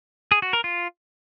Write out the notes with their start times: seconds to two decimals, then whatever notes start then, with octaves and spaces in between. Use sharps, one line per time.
0.32 G#4
0.42 F#4
0.53 A#4
0.64 F4